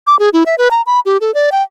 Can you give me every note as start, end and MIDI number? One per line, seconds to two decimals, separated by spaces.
0.07 0.18 86
0.19 0.29 68
0.33 0.43 64
0.46 0.55 76
0.58 0.68 71
0.71 0.82 82
0.86 1.00 83
1.06 1.17 67
1.21 1.34 69
1.34 1.50 74
1.52 1.63 79